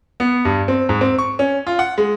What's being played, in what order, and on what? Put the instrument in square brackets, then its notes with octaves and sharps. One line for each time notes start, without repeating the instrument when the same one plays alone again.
[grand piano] B3
G2
C4
G#2
C4
C#6
C#4
F4
F#5
G#3